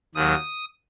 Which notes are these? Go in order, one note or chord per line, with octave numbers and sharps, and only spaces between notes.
D#2 D#3 F#3 D#6